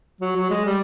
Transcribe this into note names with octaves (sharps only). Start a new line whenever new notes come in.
F#3
F#3
G#3
G3